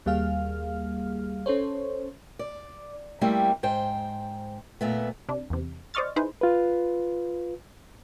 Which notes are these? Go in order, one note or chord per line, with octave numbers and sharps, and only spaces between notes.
D#2 G3 A#3 G#4 F5 F6
C#4 A4 C5 C#5
D5
G3 A3 A#3 C4 E4 G4
G#2 C5 G5
A#2 A3 B3
C3 D4
E2 C3
C5 D5 D#5 C#6 F6 A6
D#4 E4 G#4 B4 C5
F4 B4